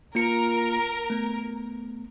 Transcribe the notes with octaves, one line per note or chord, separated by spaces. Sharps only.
A#3 F4 A#4 C#7
A3 B3